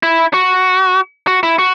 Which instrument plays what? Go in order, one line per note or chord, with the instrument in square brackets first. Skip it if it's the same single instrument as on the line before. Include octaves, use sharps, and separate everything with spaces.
[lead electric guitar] E4
F#4
F#4
E4
F#4